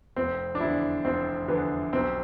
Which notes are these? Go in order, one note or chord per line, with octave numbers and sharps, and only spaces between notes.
F1 C4
D4
E2 D3 E4
F1 C4
E2 D3 B3
B1 C4